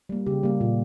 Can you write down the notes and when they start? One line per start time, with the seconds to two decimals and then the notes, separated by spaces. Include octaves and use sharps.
0.09 G3 A#3
0.26 C#3 G4
0.43 G3 A#3
0.61 A#2